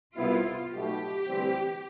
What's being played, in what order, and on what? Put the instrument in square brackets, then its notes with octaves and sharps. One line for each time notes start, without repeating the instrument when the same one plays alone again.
[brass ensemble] C2 B2 B3 E4 [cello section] F4
[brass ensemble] B1 B2 A3 [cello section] G4
[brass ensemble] D2 C3 E3 G3 C4